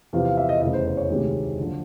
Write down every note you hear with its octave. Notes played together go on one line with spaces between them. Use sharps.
E2 C3 F3 F5
F5
E5
D#5
F1 E2 C#3 D#5
C5
C5
C#5
D2 C3 D#3 G#3
F#1 D3 F3